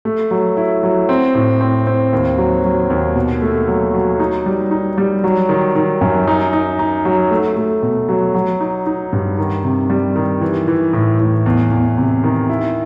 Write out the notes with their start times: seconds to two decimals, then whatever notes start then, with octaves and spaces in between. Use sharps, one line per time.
0.05 A3
0.31 F#3
0.57 E4
0.83 F#3
1.09 C4
1.35 A2
1.61 C4
1.87 C4
2.13 D#2
2.38 F#3
2.64 F#3
2.90 D#2
3.16 B2
3.42 A3
3.68 F#3
3.94 F#3
4.20 D#4
4.46 G3
4.71 D#4
4.98 G3
5.24 F#3
5.49 D#3
5.75 D#3
6.01 F#2
6.27 D#4
6.53 D#4
6.79 D#4
7.05 F#3
7.31 A3
7.57 A3
7.82 B2
8.09 F#3
8.34 F#3
8.61 D#4
8.87 D#4
9.13 G2
9.38 D#3
9.64 C3
9.90 G3
10.16 D#3
10.41 E3
10.68 E3
10.93 A2
11.19 A2
11.46 E2
11.71 E2
11.97 C3
12.24 D#3
12.49 E4